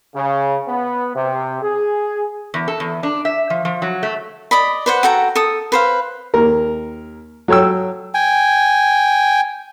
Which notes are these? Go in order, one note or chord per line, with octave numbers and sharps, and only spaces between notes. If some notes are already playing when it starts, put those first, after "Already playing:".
C#3
B3
C3
G#4
E2
A4
E2
D4
E5
F3
F3
F#3
A3
D5 D#5 B5
B4 C5 F#5
F#4 A4 G5 A#5
A4 D#6
B4 C5 F5
D#2 A#4
F#3 A4 C#5 G5 E6
G5 G#5